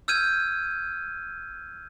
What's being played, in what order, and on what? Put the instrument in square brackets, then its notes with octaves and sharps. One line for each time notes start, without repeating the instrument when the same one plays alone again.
[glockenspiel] E6 F6 G6 G#6 D#7